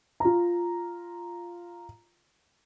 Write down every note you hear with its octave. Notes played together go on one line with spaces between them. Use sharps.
F4 A#5